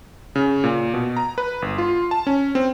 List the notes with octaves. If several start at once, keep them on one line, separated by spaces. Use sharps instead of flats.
C#3
A#2
B2
A#5
B4
G1
F4
A5
C#4
C4